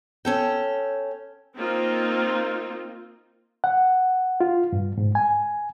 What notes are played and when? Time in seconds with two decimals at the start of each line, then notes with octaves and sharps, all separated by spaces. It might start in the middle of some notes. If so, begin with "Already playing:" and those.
0.25 C#4 A4 G5
1.57 A#3 C4 D#4 F4
3.64 F#5
4.41 F4
4.73 G2
4.98 G#2
5.15 G#5